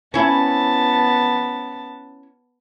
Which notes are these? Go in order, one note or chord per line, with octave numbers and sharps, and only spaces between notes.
B3 C#4 E4 A5